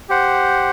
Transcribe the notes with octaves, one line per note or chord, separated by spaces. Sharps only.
G4 C5 F#5